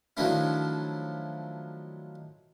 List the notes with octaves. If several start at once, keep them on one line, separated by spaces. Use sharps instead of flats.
D#3 F3 F#3 A3 D4 E4